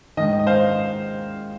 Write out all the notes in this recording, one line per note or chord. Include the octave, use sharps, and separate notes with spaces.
G#2 D#3 D#5
D#5
C5 F5